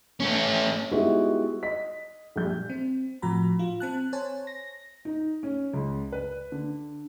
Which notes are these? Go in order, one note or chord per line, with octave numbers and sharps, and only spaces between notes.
A3 C#4
G3 G#3 B3 D#4 E4 F#4
D#5 B6
A#1 G3 G6
C4
A2 F3 F#4 A#5 B5
F4
C4 A5 F#6
C5 C#5 G#5 A5
A#6
D#4
C#4
C#2
B4
D3